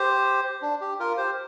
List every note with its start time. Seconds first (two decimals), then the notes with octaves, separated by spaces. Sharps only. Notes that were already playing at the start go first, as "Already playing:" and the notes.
Already playing: G4 C5
0.62 D4
0.81 G4
1.00 F4 A#4
1.17 G4 C5